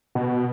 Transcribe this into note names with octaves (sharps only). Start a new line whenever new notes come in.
B2